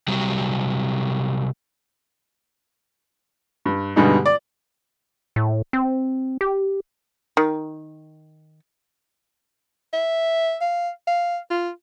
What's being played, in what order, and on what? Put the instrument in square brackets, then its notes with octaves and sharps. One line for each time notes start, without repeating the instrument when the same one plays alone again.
[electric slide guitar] C3 F#3 G3
[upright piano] G2
G2 B2 D3 G3 G#3 D#4
D5
[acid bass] A2
C4
G4
[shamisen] D#3
[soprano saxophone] E5
F5
F5
F4